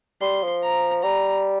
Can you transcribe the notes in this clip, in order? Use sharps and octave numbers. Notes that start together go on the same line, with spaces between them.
G3 C6
F3
A#5
G3 A#5